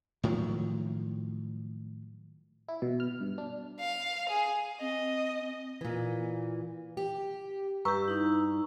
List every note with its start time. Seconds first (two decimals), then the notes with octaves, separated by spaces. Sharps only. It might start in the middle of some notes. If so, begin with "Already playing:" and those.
0.23 A2 D#3 F3 F#3
2.68 E4
2.82 B2
3.00 F6
3.21 G2
3.38 D4
3.80 F5
4.29 G#4
4.81 C4 D#5
5.81 A#2 E3
6.97 G4
7.85 G2 G4 B4 A#5 C#6 E6
8.08 D#4 E4